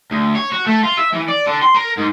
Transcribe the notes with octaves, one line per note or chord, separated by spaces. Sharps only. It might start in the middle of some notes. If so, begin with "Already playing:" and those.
D2
C#5
F#4
A3
F4
E5
E3
D5
D3
C6
A#4
G#2